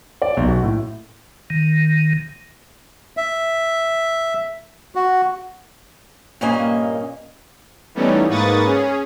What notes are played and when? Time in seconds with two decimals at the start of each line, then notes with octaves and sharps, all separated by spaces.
0.22 D5
0.37 B1
0.48 F#4
0.63 A2
1.50 D#3
3.17 E5
4.95 F#4
6.41 G2 A#2 A#3 C#4 D#5 G#5
7.95 E3 G3 A3 B3 C#4 D#4
8.28 G#2 A#3 B4 C#6 D#6 A6
8.65 C#4 G#4